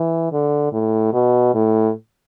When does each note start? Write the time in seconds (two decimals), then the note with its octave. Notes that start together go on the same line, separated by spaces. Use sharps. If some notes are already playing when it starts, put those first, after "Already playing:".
Already playing: E3
0.32 D3
0.73 A2
1.13 B2
1.54 A2